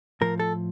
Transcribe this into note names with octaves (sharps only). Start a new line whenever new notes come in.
A2 F3 A#4
A4